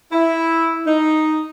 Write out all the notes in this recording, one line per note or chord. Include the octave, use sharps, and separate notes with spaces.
E4
D#4